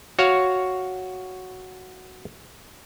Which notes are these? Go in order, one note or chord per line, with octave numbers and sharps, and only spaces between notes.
F#4 C#5 F5